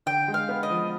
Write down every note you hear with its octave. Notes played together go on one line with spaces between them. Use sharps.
D3 G5
G#3
F5
B3
D#5
F3